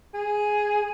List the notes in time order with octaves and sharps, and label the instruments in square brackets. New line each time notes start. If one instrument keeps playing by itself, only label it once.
[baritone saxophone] G#4